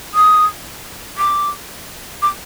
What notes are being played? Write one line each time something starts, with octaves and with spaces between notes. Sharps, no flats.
D#6
D6
D6